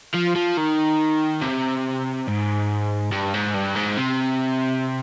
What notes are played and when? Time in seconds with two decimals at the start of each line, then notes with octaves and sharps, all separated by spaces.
0.15 F3
0.36 F3
0.57 D#3
1.42 C3
2.28 G#2
3.12 G2
3.34 G#2
3.55 G2
3.76 G#2
3.97 C3